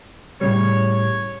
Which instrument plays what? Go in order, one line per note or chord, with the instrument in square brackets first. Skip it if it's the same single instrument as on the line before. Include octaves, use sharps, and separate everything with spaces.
[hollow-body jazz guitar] A2 C#3 G3 [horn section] C#5